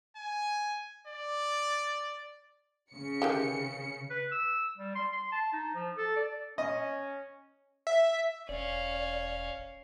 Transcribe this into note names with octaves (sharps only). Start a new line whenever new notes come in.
G#5
D5
C#3 C#7
D#3 E3 G4
B4
E6
G3
C6
C6
A5
D#4
F3
A4
D5
C#4 D#5
E5
E1 C#4 D5 F5